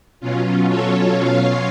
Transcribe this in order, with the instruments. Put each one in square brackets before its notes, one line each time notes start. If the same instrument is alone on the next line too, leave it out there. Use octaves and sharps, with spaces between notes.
[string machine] B2 F#3 C#4 F4
A4 C#5
B2 F#3 C#4 F4 C#5 F5